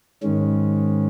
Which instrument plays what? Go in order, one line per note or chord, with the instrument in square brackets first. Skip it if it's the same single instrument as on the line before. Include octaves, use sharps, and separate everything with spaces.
[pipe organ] G#2 D#3 G#3 C#4